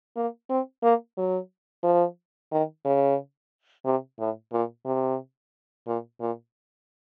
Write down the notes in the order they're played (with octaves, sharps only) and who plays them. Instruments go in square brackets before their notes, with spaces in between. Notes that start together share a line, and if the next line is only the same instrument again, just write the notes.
[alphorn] A#3
C4
A#3
F#3
F3
D#3
C#3
C3
A2
A#2
C3
A#2
A#2